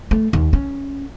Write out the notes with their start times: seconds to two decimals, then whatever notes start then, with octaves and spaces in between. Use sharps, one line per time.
0.11 A3
0.33 D#2
0.53 C#4